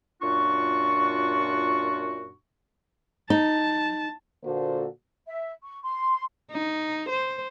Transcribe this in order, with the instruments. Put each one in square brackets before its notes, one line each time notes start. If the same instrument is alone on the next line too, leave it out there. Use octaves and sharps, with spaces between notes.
[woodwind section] F#2 A#2 D4 F4 F#4 C#6
[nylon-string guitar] D#4 [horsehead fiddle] A5
[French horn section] A#2 D3 A#3 F#4 A4 C5
[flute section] E5
C#6
C6
[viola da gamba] D#4
C5